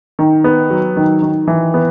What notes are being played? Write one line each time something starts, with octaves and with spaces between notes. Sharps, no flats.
D#3
B3
F#3
D#3
D#3
E3
B3